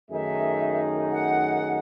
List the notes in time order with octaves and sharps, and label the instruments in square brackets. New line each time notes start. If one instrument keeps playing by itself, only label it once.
[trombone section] F#2 D#3 A3 D#4 G#4 [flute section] E5
[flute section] F#5